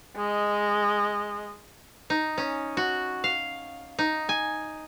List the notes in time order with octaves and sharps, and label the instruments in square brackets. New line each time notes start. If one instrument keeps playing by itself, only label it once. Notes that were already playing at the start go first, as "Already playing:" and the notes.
[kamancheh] G#3 D#5
[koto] D#4
C#4
F#4
F5
D#4
G#5